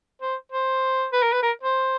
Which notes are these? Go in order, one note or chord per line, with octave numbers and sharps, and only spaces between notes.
C5
C5
B4
A#4
B4
A#4
C5